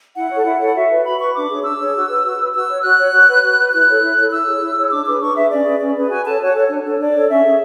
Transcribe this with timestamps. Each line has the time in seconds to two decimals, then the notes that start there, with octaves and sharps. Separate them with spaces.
0.16 E4 F#5
0.30 A4 C#5
0.45 E4
0.60 A4 C#5
0.68 F#5
0.75 F#4 E5
0.90 B4
1.04 F#4 B5
1.19 B4 C#6
1.34 D4 D6
1.49 G#4 C#5
1.63 D4 E6
1.79 G#4 C#5
1.94 F#4
2.08 B4
2.23 F#4
2.39 B4
2.53 F#4 E6
2.68 C#5
2.83 F#4 F#6
2.98 C#5
3.12 F#4
3.28 B4
3.42 F#4
3.58 B4
3.72 E4 F#6
3.88 A4 C#5
4.02 E4
4.17 A4 C#5
4.31 E4 E6
4.46 G#4 C#5
4.61 E4
4.76 G#4 C#5
4.91 D4 D6
5.05 G#4 B4 D6
5.20 D4 C#6
5.35 G#4 B4 E5
5.50 C#4 D5
5.65 G#4 B4
5.80 C#4 D5
5.95 G#4 B4
6.09 F#4 G#5
6.25 A4 C#5 A5
6.40 F#4 C#5
6.55 A4 C#5
6.69 D4
6.84 A4 C#5
6.98 D4 D5
7.14 A4 C#5
7.28 C#4 E5
7.44 G#4 C#5